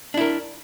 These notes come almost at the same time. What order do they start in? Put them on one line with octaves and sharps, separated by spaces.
D4 E4 A#4